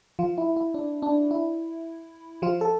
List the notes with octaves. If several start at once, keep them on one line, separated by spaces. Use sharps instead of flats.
F3 F4
E4
E4
D4
D4
E4
F3 F4
A4